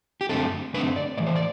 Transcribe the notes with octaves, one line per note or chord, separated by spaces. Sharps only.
G4
F#2 D3 A3 C4 A4
F#2 D3 A3 C4 B4
D5
A2 E3 A3 D5
C5
D5